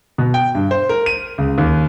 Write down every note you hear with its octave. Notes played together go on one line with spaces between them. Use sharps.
B2
G5
G2
C5
A#4
D#7
C#2
D#2